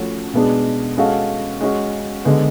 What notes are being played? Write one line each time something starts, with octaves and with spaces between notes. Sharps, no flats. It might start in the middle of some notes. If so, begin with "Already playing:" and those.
Already playing: F3 A3 C#4 F#4 C#5
B2 G#3 B3 D4 G#4
G#3 C#4 F#4 A4 F5
G#3 C#4 F#4
D3 G#3 B3